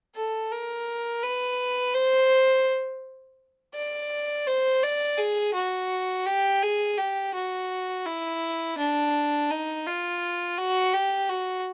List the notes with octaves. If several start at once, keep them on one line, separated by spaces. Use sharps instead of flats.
A4
A#4
B4
C5
D5
C5
D5
G#4
F#4
G4
G#4
G4
F#4
E4
D4
D#4
F4
F#4
G4
F#4